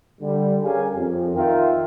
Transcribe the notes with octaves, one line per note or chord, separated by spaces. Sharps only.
D3 G3
C#4 G4 G#4 A#4 F5 G#5
F2
D#3 F4 A#4 E5 F5 G5